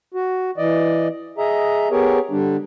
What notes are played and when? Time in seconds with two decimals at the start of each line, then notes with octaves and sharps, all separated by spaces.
0.14 F#4
0.57 E3 D5 D#5
1.38 G#4 D#5 E5 A#5
1.91 B3 G4 G#4 A#4 C#5
2.31 D3 G3 D4